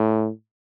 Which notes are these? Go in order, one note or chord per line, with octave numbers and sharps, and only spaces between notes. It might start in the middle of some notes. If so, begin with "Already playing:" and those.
Already playing: A2